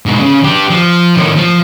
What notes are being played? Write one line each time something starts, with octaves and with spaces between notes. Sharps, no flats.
G#2 B2
C#3
D4 G4
F3
A2 D#3
F3